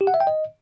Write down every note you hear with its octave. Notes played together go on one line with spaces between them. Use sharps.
G4
F#5
E5
G5
D#5